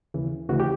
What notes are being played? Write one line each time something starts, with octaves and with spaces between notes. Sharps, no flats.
D#2 C#3 E3
D2 C#3 E3 F#4
G4